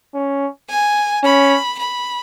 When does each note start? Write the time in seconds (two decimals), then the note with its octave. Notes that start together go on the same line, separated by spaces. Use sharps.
0.14 C#4
0.69 G#5
1.24 C#4 B5
1.78 B5